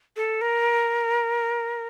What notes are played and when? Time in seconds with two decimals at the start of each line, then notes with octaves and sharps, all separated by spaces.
0.16 A4
0.41 A#4